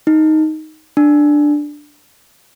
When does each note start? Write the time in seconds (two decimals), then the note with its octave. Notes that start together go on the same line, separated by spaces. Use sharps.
0.07 D#4
0.97 D4